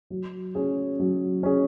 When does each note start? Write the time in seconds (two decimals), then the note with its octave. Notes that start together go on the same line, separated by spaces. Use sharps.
0.10 F#3
0.55 C#4 G#4
0.99 F#3
1.43 C#4 G#4